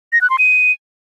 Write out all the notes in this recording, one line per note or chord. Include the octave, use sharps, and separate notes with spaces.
A#6
F#6
C6
D#7